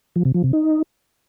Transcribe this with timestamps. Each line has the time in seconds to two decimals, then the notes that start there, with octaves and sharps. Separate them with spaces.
0.16 F3
0.25 C3
0.34 F3
0.44 C3
0.53 D#4